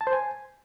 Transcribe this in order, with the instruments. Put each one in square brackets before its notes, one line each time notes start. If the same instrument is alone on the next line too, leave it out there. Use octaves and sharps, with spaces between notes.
[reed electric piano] A5
C5
G#5